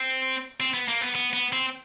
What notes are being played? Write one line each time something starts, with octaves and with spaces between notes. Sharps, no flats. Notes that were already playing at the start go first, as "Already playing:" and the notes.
Already playing: C4
C4
B3
A#3
B3
B3
B3
C4